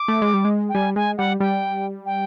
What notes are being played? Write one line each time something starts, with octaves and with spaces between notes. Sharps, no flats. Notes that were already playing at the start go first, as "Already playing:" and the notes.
Already playing: D6
A3
G#3
G3
G#3
G5
G3 G#5
G#3 G#5
G3 F#5
G3 G5
G5